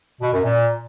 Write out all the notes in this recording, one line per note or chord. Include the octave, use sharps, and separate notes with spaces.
B2
F#2
A#2